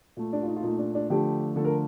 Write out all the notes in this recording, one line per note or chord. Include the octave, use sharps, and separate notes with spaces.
A#2 A3
D4
F4
D#4
F4
A#2 A3 D#4
D4
D4
D3 F3 A3 G4
D3 F3 A3 A4
A#4